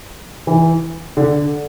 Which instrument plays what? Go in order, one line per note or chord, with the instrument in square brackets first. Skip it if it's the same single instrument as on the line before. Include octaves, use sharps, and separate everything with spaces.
[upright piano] E3
D3